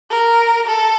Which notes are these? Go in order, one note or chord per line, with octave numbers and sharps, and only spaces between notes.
A#4
A4